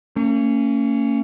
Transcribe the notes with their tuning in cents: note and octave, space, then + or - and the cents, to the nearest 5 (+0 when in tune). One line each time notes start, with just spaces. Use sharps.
A#3 -45 C#4 +0